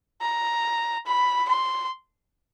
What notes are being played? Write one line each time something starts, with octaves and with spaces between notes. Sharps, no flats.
A#5
B5
C6